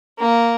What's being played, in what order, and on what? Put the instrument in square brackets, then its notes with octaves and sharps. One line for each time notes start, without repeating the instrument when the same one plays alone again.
[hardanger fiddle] A#3